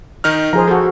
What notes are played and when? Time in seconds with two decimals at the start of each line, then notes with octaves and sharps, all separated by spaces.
0.24 D#3 D#4 F6
0.53 F3 G#4 C5 A#5
0.68 F3 F#4 A4